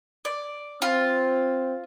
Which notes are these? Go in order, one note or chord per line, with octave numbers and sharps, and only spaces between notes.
D5
C4 F4